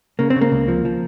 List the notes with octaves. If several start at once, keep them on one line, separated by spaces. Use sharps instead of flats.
C#3 A#3
C4
C#3
A#3
C#2
F3
F3